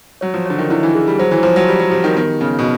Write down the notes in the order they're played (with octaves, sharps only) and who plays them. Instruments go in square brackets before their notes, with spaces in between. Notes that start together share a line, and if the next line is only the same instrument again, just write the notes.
[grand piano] F#3 [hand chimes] C#5
[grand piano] F3
[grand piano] D3 [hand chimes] C#5
[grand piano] D#3
[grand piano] D3 [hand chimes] E4
[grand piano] E3
[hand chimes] G#4
[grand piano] G3
[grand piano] F#3 [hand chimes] C5
[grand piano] E3
F#3
[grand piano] F3 [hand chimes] C5
[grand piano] F#3
[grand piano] G3 [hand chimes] G4
[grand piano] F#3
[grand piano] F3 [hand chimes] G4
[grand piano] D#3
[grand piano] D#3 [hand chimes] B3
[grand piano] C#3 [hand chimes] B3
[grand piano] B2